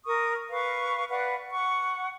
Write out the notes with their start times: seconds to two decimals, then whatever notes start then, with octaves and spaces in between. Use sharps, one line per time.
0.06 A#4 C#6 D#6
0.50 B4 F5 C#6
1.09 B4 D5 F5 F#5
1.51 F#5 C#6